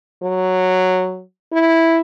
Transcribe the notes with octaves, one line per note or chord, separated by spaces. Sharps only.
F#3
E4